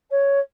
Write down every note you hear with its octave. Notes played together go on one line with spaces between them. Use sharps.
C#5